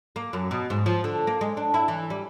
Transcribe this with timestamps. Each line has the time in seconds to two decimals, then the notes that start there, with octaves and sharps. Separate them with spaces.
0.16 A#3
0.33 F#2
0.51 B2
0.70 G#2
0.86 F3
1.04 D3
1.27 A#3
1.41 G#3
1.57 D4
1.74 E4
1.88 E3
2.10 G3